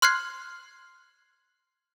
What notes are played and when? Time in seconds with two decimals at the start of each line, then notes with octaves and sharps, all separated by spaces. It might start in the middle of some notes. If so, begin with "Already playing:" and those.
0.02 C6 F6 F#6 G#6 C7